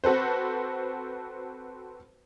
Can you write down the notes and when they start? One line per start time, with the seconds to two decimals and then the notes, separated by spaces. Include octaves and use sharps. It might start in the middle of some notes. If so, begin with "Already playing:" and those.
0.04 C4 F#4 A4 B4 C5